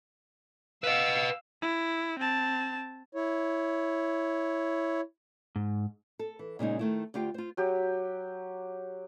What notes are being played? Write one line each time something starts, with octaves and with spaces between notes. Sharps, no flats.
B4 D#5 F5 E6
E4
C4 A5
E4 C#5
G#2
A4
E3
A#2 C#3 G#3 D#4
D#3 A3 E4
D2 F4 G4 F5 G5
F4 C5
F#3 G4